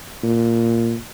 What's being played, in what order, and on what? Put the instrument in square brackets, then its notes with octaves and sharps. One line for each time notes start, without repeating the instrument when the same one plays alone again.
[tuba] A#2